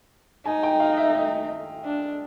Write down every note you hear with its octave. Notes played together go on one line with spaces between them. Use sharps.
D#4 G#5
G5
F5
E5
D#5
D4